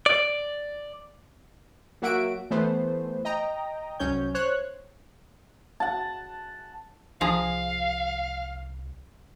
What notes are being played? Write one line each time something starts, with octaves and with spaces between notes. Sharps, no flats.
D5
F#3 A#3 F#4 E5 F#5 D7
E3 A3 B3 C5
D#5 G5 A#5
C2 F#3 C#4 C#5 G6
C5 C#5 F#6
F#5 A5
C2 F3 G#4 F5 A#5